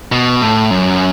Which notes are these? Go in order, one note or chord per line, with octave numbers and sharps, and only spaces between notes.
B2
A2
F#2